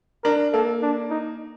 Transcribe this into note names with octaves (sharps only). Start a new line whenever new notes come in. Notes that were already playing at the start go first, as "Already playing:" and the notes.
D4 A#4
A#3 A4
D4
D#4